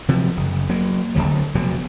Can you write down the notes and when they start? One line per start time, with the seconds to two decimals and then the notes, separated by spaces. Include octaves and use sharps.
0.09 C3 F3 F#3
0.37 F#1
0.69 F#3 A#3
1.15 D1 D#2 D3 F#3
1.55 F1 B2 F#3